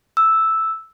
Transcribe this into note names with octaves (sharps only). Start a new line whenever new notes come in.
E6